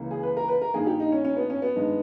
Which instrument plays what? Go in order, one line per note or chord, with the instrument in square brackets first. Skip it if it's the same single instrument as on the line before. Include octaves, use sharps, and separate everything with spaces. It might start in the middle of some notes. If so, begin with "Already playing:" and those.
Already playing: [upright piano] C#2 C#3 E3 A#3
G#4
B4
A#4
B4
A#4
G2 D#3 A#3 G#4
G4
D#4
C#4
C#4
B3
C#4
B3
G2 D#3 G#3